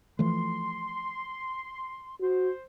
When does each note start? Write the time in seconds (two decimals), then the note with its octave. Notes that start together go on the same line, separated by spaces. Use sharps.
0.19 E3 F3 A3 C6
2.21 F#4 C5